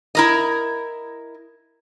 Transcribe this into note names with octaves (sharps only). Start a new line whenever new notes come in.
E4 A#4 D#5